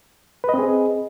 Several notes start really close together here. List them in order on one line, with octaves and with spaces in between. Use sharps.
B4 D#5 C4 G#4